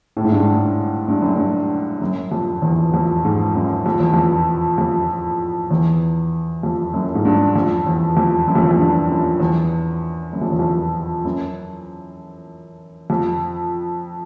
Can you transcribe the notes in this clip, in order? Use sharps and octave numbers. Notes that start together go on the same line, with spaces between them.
A2
G#2
G2
G#2
G2
F#2
G2
F#2
F2
E2
F2
G#2
F#2
F2
E2
F2
F2
E2
F2
F#2
G#2
G2
F2
E2
F2
F#2
F2
E2
F2
G2
F#2
E2
F#2
F2
E2
F2
F#2
F2